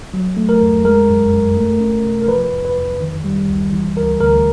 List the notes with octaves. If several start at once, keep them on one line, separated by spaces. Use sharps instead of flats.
F#3
A3
A#4
F2
G#3 A#4
F#2
F#2
A3
C#4
C3
A#4
F3 B4
F2
B4
F2
D#3
G3
C#2
E3
D2 A#4
D2 A#4